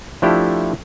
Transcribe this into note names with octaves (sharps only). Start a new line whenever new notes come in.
F3 A3 D4 E4 G4